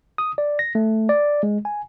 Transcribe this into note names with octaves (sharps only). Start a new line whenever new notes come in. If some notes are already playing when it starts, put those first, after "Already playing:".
D#6
D5
A#6
A3
D5
G#3
G#5